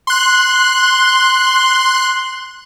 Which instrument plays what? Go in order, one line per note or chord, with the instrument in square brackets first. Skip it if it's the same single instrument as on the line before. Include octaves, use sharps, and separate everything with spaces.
[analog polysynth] C6 F#6